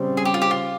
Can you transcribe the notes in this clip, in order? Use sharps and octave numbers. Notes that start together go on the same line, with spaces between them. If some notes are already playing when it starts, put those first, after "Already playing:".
Already playing: C#3 G3 C4
G#4
G4
F4
G4
F4